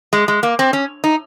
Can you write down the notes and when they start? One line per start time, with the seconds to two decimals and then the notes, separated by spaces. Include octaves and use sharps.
0.13 G#3
0.28 G#3
0.43 A#3
0.59 C4
0.73 C#4
1.04 D#4